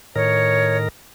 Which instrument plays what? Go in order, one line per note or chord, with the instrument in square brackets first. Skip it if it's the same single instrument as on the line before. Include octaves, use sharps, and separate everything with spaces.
[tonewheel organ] A2 D#3 A#4 [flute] C#5